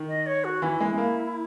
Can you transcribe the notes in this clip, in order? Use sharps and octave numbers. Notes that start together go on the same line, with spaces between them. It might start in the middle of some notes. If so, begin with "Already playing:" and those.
Already playing: D#3
D#5
C#5
F#4
E3 E4
G#3
G#3
A#3